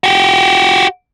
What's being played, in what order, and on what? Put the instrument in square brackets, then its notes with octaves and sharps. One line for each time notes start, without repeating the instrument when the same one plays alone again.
[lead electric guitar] F#4 G4